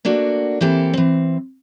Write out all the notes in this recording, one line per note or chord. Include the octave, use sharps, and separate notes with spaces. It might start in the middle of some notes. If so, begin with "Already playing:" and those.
A3 A#3 D4 F#4
E3 A#3 C4 E4 G4 A4
E3 C4